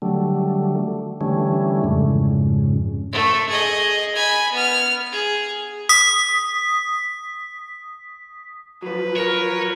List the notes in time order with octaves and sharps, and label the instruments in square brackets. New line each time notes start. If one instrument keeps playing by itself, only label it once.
[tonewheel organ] D3 F#3 G3 A3
D3 E3 G3 A3 C#4
F2 G#2 C#3
[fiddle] A3
G#4 D#5
G#5 B5
B3 F6
G#4
[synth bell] D#6 B6
[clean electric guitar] F3 F#3 [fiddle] B4
[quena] A#4 [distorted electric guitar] C#5